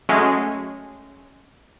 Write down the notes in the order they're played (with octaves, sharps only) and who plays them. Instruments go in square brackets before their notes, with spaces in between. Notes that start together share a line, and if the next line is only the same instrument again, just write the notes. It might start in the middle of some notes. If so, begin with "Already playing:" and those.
[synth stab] F#3 G#3 A3 C#4